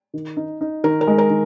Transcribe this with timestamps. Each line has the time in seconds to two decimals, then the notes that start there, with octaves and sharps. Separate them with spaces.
0.14 D#3
0.37 D#4
0.61 D#4
0.84 D#3 A#4
1.01 A#4
1.07 G#3
1.18 A#4
1.30 D#3